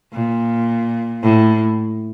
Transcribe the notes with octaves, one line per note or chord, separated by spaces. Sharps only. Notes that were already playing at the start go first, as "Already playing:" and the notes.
A#2
A2